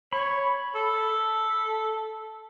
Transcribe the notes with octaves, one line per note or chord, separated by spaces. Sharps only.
C#5 B5
A4